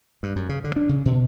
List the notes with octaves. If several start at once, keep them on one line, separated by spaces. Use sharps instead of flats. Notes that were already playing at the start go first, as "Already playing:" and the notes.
G2
F#2
C#3
D3
D4
C#3
B2